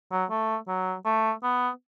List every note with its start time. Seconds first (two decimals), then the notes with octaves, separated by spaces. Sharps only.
0.11 F#3
0.30 A3
0.68 F#3
1.05 A3
1.43 B3